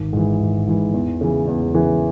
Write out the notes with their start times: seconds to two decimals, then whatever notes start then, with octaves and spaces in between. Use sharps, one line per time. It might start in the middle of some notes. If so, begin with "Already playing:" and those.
Already playing: G#1
0.13 G#2 E3
0.40 G#1
0.67 G#2 E3
0.93 E2
1.21 C#3 E3
1.47 E2
1.74 C#3 E3